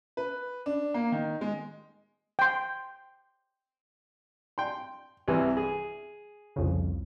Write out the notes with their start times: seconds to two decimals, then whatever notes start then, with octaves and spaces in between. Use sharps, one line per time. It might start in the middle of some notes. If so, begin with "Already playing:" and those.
0.17 B4
0.66 D4
0.94 A#3
1.12 D#3
1.41 G#3
2.39 G5 C6
4.58 G5 C6
5.28 C2 C3 E3
5.57 G#4
6.56 C2 F2 C#3